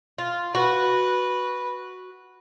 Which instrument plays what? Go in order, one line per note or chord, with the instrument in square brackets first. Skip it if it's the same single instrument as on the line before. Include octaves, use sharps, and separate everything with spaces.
[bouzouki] F4
[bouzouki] F#4 [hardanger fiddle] B4